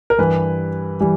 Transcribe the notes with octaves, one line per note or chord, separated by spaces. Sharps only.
A#4
G2 E3 G3 B4
E3 G3